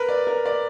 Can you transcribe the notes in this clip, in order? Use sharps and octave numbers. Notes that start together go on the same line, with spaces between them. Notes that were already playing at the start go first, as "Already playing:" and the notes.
Already playing: A#4 B4
D5
A#4
D5